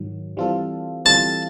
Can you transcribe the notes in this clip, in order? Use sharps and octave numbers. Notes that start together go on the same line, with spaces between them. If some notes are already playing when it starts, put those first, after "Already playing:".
Already playing: G#2 D#3 F#3
E3 G3 C4 F4 A4
E3 G3 C4 F4 A4 A5